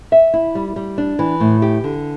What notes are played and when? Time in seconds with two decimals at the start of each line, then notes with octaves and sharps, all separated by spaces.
0.12 E5
0.34 E4
0.55 G3
0.76 G3
0.98 D4
1.19 E3
1.40 A2
1.62 G4
1.84 D3